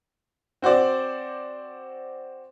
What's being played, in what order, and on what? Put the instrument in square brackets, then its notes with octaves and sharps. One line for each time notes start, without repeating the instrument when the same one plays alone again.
[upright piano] C4 F#4 C5 D5